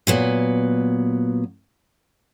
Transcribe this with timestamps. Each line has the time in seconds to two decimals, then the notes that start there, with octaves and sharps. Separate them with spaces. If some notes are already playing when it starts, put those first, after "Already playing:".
0.07 A#2 F#3 B3